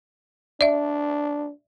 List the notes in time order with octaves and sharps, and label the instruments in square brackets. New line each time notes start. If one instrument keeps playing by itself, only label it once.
[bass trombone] D4 [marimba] D5 E5